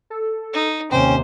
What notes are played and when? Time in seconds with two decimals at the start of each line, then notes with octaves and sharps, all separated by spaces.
0.10 A4
0.53 D#4
0.91 D#2 C3 C#4 C5 G5